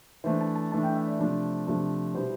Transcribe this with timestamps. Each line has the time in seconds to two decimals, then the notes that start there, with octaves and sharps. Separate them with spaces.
0.24 E3 A3 D4 C5
0.41 A5
0.55 A5
0.72 E3 A3 D4 A5
0.83 G5
0.95 E5
1.07 D5
1.19 C3 F3 A3 D4
1.67 C3 F3 A3 D4
2.14 B2 G3 B3 E4 C5